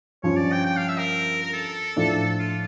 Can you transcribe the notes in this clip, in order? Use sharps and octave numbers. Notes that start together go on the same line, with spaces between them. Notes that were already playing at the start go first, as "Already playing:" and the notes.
G2 F3 C#4 F4 C#5
D5
G5
G5
F5
E5
A#4
A#4
A4
A2 F3 A3 D4
F4